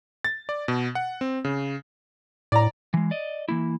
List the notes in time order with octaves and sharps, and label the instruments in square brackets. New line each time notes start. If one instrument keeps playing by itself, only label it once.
[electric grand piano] A6
D5
B2
F#5
C4
C#3
[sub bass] A2 [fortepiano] D5 A#5
[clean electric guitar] E3 G#3
D5 D#5
E3 A#3 E4